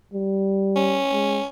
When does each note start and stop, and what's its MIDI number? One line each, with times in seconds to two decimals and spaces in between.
0.13 1.02 55
0.76 1.46 61
1.13 1.40 56